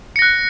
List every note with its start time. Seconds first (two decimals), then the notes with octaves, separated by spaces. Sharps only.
0.16 C#7
0.19 A#6
0.22 F#6